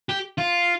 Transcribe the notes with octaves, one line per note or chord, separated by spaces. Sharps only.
G4
F4